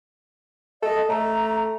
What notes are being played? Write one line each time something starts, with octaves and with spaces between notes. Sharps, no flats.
A4 D#5
A3 A#5